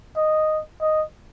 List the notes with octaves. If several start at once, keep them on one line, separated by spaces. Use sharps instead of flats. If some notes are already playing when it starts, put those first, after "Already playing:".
D#5
D#5